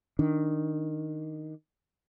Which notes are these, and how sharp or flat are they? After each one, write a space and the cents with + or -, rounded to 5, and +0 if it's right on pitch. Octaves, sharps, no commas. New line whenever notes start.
D#3 +0 D4 +0